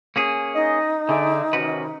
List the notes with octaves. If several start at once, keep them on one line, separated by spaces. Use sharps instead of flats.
A#3 C#4 G#4
D#4 D#5
D3 G#4 D5 E5
G#2 C3 D#3 C#4 F#4 B4